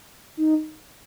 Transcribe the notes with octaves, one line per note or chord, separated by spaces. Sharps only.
D#4